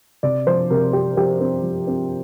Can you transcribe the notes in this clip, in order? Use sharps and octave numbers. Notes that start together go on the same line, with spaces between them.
C3 D5
F3 C5
C3 A#4
C4 G4
F3 G4
C4
F3
C4